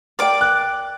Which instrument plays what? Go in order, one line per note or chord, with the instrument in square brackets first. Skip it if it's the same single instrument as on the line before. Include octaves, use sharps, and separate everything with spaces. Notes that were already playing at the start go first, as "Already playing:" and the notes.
[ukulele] A#4 G5 [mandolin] D5 D6
[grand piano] F#6